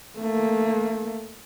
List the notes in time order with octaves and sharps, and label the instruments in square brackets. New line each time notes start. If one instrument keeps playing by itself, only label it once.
[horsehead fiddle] A3 A#3